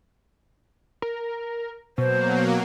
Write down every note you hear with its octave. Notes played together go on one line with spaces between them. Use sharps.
A#4
B2 F#3 A#3 C5